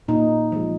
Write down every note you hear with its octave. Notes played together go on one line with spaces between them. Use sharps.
A#2 D#4
F3 G#3